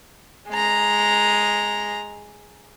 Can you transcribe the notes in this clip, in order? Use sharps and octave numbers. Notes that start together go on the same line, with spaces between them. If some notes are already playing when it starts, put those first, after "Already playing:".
G#3 A#5